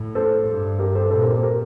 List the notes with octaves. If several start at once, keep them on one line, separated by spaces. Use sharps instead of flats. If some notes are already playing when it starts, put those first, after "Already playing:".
Already playing: A2
A4 C5
G2
G4 A#4
A4 C5
A#2 A4 C5
G4 A#4
A4 C5
G4 A#4